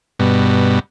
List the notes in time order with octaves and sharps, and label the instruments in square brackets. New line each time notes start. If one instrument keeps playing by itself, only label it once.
[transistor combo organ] G2 B2